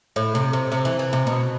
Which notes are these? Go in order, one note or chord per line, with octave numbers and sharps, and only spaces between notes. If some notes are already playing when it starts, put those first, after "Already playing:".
A2
C3
C3
C3
E3
E3
C3
B2